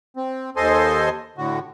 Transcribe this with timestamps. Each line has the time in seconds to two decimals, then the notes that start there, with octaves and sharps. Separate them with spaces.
0.17 C4
0.56 D#2 A4 C5 D#5 G#5 C6
1.38 A2 D3 F#4